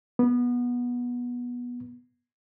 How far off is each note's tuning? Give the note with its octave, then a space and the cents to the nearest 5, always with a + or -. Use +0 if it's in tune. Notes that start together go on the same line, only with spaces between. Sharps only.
B3 -20